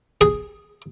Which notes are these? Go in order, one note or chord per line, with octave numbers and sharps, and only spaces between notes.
G#4